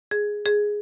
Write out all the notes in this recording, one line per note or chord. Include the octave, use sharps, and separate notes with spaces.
G#4
G#4